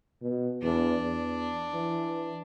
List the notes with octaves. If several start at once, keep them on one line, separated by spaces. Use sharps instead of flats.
B2
E2 D4
E2
E3